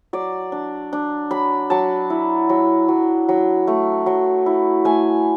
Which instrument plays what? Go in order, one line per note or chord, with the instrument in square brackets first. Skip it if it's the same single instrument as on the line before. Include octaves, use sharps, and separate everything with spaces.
[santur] F#3 D5
D4
D4
F#3 B5
F#3 A5
E4
F#3
F#3
F#3
A3
F#3
E4
A3 G#5